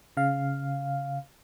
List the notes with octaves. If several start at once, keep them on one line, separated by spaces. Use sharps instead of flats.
C#3 F5